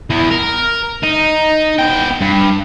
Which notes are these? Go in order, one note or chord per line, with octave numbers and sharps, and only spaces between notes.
E2 E3
A#4
D#4
B3 G5
G2